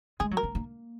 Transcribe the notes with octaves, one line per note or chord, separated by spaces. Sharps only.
G#3 G#4
F#3
A#4
A#3
A#3